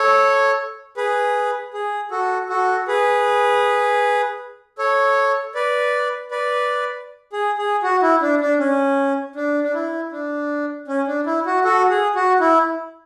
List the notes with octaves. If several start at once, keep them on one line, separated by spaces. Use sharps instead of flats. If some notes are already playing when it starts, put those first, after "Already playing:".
Already playing: A4 C#5
G#4 B4
G#4
F#4 A4
F#4 A4
G#4 B4
A4 C#5
B4 D5
B4 D5
G#4
G#4
F#4
E4
D4
D4
C#4
D4
D4
E4
D4
C#4
D4
E4
F#4
F#4 A4
G#4
F#4
E4